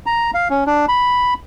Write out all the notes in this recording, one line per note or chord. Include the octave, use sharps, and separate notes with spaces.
A#5
F5
C#4
D4
B5